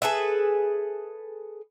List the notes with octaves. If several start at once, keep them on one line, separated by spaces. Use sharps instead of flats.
G#4 A4 B4 E5